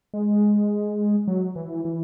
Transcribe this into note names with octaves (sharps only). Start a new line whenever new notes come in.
G#3
F#3
E3
E3